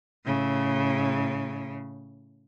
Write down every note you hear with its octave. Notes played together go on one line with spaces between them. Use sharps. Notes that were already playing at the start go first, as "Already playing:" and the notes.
A2 C#3